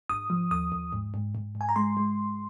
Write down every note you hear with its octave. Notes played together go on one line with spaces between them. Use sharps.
G#1 D#6
F3
D#2 D#6
D#2
G#2
G#2
G#2
G#2
G#5
A#5
G#3 C6
G#3